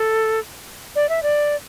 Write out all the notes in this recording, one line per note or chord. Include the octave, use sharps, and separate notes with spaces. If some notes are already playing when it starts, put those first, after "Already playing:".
Already playing: A4
D5
E5
D5